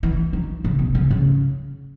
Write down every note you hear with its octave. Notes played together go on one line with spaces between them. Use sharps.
E3
D#3
C#3
B2
C#3
C#3